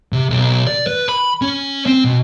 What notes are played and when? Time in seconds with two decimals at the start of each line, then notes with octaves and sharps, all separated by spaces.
0.12 C3
0.30 B1
0.67 D5
0.87 B4
1.09 B5
1.42 C#4
1.86 C4
2.04 B2